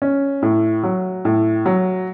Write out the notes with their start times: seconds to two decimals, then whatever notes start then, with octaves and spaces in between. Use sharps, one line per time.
0.02 C#4
0.42 A2
0.83 F#3
1.25 A2
1.66 F#3